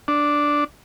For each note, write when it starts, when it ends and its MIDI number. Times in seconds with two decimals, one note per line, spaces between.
0.08 0.64 62